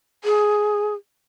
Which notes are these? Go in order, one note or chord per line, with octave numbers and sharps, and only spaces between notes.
G#4